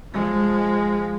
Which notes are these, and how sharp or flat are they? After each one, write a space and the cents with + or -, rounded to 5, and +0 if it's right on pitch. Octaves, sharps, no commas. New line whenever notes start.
F3 +0 G#3 -10